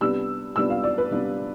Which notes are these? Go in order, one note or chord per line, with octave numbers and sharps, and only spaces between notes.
C3 G3 B3 D4 E6
C3 G3 B3 D4 E6
F5
D5
B4
C3 G3 B3 D4